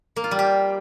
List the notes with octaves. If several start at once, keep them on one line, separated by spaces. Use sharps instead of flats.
A#3
F4
G3
G4